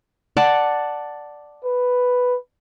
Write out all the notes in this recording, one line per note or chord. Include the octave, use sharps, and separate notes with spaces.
D5 F#5 A5
B4